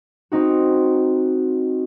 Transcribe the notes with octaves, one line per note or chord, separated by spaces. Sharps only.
C4 D#4 F#4